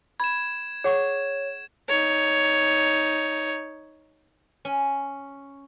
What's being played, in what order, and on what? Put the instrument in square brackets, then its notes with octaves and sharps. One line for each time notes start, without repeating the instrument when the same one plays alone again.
[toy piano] B5 [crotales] G#6 E7
[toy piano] G#4 F#5 C#6 [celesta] C#5
[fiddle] D#4 C#5
[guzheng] C#4